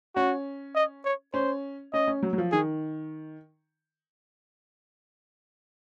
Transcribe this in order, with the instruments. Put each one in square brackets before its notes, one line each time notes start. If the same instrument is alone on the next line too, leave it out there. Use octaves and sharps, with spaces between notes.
[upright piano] C#4 [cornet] F#4
[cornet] D#5
C#5
[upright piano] C#4 [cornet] C5
[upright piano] C#4 [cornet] D#5
[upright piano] C#4
F#3
F#3
F3
[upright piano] D#3 [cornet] G#4